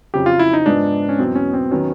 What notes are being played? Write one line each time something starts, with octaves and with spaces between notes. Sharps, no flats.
F2 C#3 F#3 G4
F4
E4
D#4
G#2 F3 G#3 B3 D4
C#4
E2 B2 F#3 B3 C4
C#4
C4
D#3 F#3 B3 C#4